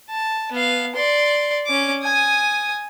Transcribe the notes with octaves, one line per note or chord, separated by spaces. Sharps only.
A5
B3 F5
D5 C6
C#4 D6
G#5 D#6